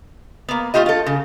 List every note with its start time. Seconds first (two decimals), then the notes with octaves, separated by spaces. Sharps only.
0.49 A#3 B3
0.74 A3 D4 F4 G4 D#5
0.86 F4 A4
1.06 C#3